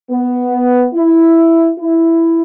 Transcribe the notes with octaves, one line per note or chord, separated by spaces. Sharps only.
B3
E4
E4